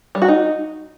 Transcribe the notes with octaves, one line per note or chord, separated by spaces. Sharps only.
G3
F#4
D#4